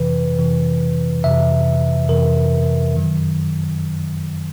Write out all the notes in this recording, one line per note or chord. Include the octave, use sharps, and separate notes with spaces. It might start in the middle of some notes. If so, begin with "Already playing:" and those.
Already playing: F2 C3 E3 B4
F2 C3 E3
F2 C3 E3 E5
F2 C3 E3 A#4
F#2 D#3 F#3